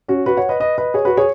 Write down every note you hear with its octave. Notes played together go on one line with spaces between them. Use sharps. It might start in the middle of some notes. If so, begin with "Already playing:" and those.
C#4 F#4
F#4 B4
C#5 F#5
B4 D#5
B4 D#5
B4 D#5
G#4 C#5
F#4 B4
G#4 C#5